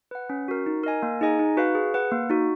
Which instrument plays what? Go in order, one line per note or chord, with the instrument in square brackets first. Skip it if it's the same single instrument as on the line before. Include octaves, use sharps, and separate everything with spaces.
[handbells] B4 F#5
C#4
F#4 A#4
D#4
A#4 D#5 G#5
A#3
D#4 G#4 D#5 G#5
D#4
F#4 B4 F5
G#4
B4 F#5
A#3
D#4 F#4